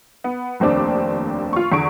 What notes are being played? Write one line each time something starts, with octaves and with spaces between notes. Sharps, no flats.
B3
F1 D#2 C4 D4 D6
F4 C#6
E2 D3 C#6 D7